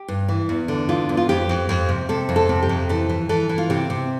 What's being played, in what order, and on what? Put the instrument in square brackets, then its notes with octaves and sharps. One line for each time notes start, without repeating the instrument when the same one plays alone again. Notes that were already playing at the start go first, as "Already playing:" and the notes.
Already playing: [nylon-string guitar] G4
G2
E3
E2
D3
E2 F4
E2
F4
F2 G4
F2
F2
C3
C3 A4
F2
A4
C3
G4
F2
E3 A4
E3
E3 A4
E3
F4
C3 G4
C3